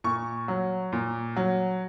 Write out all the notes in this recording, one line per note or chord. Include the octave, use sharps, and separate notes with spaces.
A#2 C#6
F#3
A#2
F#3